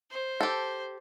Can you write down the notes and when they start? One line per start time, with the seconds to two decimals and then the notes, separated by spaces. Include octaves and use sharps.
0.11 C5
0.41 G4 A4